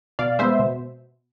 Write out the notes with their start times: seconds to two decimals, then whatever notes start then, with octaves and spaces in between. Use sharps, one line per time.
0.19 B2 D5 F5
0.39 G#3 B3 C5 E5
0.59 B2